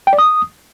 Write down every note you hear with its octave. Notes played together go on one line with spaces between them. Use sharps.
G5
D5
D#6